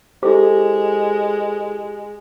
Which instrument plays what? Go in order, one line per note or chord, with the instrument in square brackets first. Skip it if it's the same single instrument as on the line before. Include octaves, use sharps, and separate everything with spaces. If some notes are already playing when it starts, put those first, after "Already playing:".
[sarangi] G#3 [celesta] E4 A4 C5 [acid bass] G4